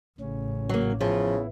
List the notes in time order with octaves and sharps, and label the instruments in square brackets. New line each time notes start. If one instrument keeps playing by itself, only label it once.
[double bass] A1 [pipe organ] A2 C#3 C#4
[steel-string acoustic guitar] F#3 A#3
[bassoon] C#3 [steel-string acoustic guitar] F3 [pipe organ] B3 E4